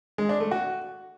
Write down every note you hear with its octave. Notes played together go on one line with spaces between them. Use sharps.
G#3
D4
A3
F#4